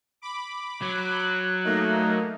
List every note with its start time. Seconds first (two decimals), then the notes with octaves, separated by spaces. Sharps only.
0.22 B5 D6
0.82 F#3 F#6
1.64 A3 A#3 D#4